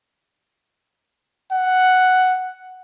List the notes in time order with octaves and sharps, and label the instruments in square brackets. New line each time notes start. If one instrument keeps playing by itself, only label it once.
[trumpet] F#5